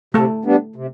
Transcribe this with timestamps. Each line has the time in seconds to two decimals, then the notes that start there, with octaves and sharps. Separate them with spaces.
0.14 C3 A3 A4
0.45 G3 B3 D4
0.76 C3